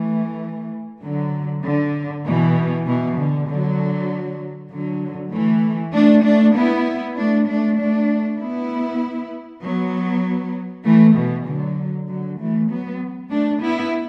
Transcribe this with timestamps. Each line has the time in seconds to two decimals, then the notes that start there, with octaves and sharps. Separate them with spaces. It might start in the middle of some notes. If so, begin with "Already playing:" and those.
Already playing: E3 A3
1.02 D3 F#3
1.64 D3
2.26 B2 E3
2.86 B2 E3
3.18 D3
3.48 D3 F#3
4.70 D3 F#3
5.32 E3 A3
5.93 A3 D4
6.24 A3 D4
6.56 B3 E4
7.17 A3 D4
7.47 A3 D4
7.78 A3 D4
8.39 B3 E4
9.62 F#3 B3
10.85 E3 A3
11.15 B2 E3
11.47 D3 F#3
12.08 D3 F#3
12.39 E3 A3
12.69 F#3 B3
13.30 A3 D4
13.61 B3 E4